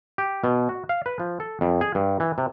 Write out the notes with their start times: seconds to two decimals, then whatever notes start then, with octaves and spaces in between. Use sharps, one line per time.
0.18 G4
0.44 B2
0.69 F#4
0.89 F5
1.06 B4
1.20 F3
1.40 A4
1.61 F2
1.81 G#4
1.95 G2
2.20 E3
2.38 C3